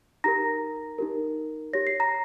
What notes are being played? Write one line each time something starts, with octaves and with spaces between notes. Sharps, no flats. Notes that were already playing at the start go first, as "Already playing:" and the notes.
D#4 G4 A#4 A#5 A#6
D#4 G4 A#4
G4 C#5 A#6
C7
A#5 A#6